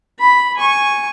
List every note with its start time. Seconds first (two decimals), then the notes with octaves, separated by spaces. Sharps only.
0.19 B5
0.57 G#5 C#6